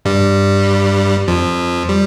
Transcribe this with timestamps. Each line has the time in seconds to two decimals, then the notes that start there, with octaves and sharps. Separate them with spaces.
0.05 G2 G3
1.28 F2 F3
1.89 G3